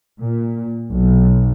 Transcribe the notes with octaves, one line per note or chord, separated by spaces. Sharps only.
A#2
B1